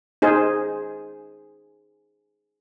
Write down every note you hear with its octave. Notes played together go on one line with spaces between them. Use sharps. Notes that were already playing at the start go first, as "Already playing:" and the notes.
D#4 G#4 C5